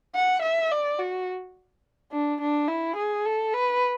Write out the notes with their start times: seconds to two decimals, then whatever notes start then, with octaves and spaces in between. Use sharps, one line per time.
0.15 F#5
0.42 E5
0.72 D5
0.99 F#4
2.12 D4
2.41 D4
2.68 E4
2.96 G#4
3.25 A4
3.53 B4